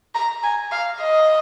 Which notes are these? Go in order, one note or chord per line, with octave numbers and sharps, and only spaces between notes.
A#5
G#5
F5
D#5